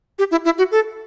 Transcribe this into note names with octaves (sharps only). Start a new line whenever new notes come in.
G4
E4
E4
F#4
A4